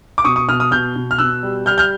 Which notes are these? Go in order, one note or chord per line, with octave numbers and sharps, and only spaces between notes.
D6
B2 C#6 D#6
C#6 D#6
B2 D#6 F6
D#6 F6
B2 F6 G6
B2
F6
B2 E6 F#6
G3
G3 F6 G6
F6 G6